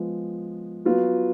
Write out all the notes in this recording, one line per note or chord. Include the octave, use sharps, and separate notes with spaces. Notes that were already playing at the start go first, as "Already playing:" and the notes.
Already playing: F3 G#3 B3
F#3 B3 F4